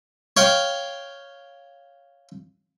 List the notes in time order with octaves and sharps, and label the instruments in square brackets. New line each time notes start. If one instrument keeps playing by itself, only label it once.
[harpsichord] C#5 F5 G5